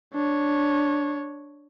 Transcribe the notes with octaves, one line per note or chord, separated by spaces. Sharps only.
D4 C#5